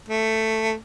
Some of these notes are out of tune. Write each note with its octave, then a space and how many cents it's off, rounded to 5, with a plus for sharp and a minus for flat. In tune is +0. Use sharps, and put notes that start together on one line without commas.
A3 +5